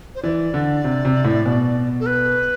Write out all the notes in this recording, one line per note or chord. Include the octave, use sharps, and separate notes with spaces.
C5
E3 D5
D3
C3
C3
A2
B2
A4
B4